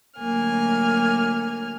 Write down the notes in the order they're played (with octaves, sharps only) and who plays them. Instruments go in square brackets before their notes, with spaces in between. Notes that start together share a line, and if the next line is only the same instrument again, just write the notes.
[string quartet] D2 F#3 A#3 G#5 F6